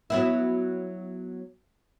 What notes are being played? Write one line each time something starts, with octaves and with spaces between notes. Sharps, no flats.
F#3 B3 E4